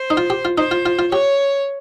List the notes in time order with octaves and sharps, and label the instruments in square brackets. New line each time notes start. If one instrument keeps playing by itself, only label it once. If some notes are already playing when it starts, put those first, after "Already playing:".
Already playing: [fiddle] C5
[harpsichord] D#4
F4
G4
F4
[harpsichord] D#4 [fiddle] C5
[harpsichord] F4
F4
F4
[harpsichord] G4 [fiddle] C#5